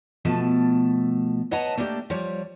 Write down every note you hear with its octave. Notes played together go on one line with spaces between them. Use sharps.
B2 F3 A3 A5
B4 C#5 D#5 F#5 A5 A#5
A3 A#3 D4 G4
F3 G3 C#5